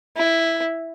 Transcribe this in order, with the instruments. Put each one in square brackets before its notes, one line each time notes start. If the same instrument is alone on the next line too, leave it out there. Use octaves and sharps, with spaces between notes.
[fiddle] E4